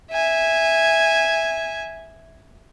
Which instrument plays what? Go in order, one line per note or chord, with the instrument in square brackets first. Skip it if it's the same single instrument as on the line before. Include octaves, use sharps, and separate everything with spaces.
[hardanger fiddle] E5 G#5